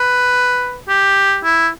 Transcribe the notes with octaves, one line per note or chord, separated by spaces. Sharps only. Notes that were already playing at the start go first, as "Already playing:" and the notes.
Already playing: B4
G4
E4